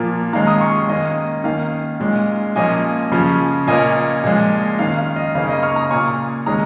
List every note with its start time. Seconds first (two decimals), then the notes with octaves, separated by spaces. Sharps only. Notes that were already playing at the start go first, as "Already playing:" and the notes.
Already playing: A#2 F3 A#3
0.33 D#3 G#3 C#4 F5 A#5
0.47 A#5 D#6
0.61 G#5 C#6
0.88 D#3 A#3 C#4 D#5
1.44 D#3 A#3 C#4 F5
2.00 A#2 G#3 C#4
2.56 A#2 F3 A#3 C#4 D#5 G#5
3.12 C#3 F3 C#4
3.67 A#2 A#3 C#4 D#5 G#5
4.24 A#2 F3 G#3
4.79 D#3 C#4 F5
4.98 F5
5.16 D#5
5.35 C#3 A#3 C#4 F5
5.49 D#5
5.63 C#6 F6
5.76 A#5 D#6
5.90 A#2 A#3 C#4 G#5 C#6
6.46 D#3 G#3 C#4 A#5 D#6